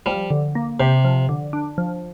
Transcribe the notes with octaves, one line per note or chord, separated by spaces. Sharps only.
F3 G3
D3
A#3
C3 G4
F3
D3
D4
F3